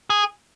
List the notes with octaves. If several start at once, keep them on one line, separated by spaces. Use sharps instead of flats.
G#4